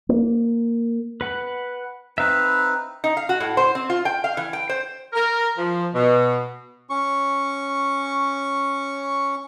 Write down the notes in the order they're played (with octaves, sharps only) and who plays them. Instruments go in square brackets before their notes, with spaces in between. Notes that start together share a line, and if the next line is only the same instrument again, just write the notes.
[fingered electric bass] A#3
[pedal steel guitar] B4 F#5
[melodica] C4 D#4 B4 [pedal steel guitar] E5 F5 B5
[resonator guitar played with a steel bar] D#4
F5
F#4
A2
C5
C4
F4
G5
F5
E3
G5
C5
[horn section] A#4
F3
B2
[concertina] C#4 C#6